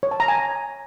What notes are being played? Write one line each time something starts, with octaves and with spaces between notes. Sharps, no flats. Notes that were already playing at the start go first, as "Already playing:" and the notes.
C#5
A5
A#5
G#5